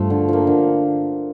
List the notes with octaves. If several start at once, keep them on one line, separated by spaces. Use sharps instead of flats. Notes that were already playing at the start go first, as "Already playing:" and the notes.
Already playing: G2 F3 A3
D3
F3 A#3
D3